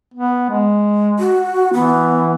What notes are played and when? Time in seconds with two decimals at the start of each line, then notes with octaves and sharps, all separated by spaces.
0.14 B3
0.49 G#3
1.19 F#4
1.74 E3 B3